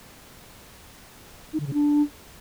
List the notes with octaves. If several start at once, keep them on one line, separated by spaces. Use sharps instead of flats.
D#4
D3
C#3
D4